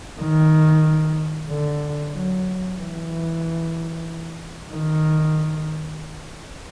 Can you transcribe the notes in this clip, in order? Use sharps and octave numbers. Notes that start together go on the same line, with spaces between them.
D#3
D3
F#3
E3
D#3